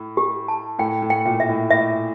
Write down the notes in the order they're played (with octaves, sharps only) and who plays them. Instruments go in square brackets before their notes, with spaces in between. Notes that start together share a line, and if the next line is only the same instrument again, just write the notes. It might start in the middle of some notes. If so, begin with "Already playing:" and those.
Already playing: [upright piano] A2
[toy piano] G4
A5
[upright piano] A2 [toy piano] G5
[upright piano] A2
[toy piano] G5
[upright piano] A#2
[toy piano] E5
[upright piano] A2
[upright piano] A2 [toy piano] E5